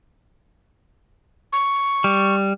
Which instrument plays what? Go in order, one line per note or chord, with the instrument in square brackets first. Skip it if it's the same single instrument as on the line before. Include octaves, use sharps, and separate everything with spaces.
[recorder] C#6
[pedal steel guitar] G3